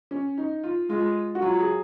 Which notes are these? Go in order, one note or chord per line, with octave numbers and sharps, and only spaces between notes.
C#4
D#4
F4
G#3 F4
F#4
F#3 F4
G#4